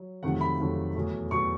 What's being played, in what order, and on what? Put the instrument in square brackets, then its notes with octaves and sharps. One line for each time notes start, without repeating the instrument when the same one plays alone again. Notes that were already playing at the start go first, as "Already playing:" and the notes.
Already playing: [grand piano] F#3
F2 C3 D#3 F#3 A3 F#5
B5
F2 C3 D#3 F#3 A3
E2 B2 F#3 A3
E2 B2 F#3 A3 C#6